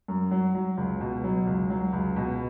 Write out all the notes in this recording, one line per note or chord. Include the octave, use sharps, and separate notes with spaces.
F#2
F#3
F#3
C#2
B2
F#3
C#2
F#3
C#2
B2